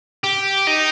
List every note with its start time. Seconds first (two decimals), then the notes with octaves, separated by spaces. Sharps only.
0.24 G4
0.67 D#4